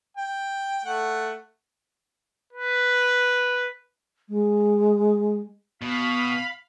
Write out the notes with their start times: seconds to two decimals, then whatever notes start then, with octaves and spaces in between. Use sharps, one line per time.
0.17 G5
0.85 A3 F#5
2.53 B4
4.29 G#3
5.81 B2 F5 B5